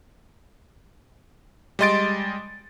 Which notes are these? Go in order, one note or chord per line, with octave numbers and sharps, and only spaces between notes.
G3 G#3 D#5 C6 A6 D7